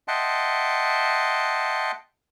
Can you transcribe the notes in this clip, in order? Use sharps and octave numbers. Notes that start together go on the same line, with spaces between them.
D#5 E5 F#5 G5 A5 C6